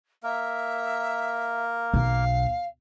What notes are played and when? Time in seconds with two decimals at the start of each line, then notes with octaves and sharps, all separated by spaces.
0.23 A#3 A#4 E5
1.94 B1 F5